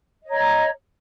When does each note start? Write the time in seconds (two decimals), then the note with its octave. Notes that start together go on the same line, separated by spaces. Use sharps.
0.23 D#5
0.27 C#5
0.30 A#5